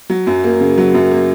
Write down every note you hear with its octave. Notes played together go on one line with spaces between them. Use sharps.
F#3
F#2
A#3
C#3
F#3
F#2
A#3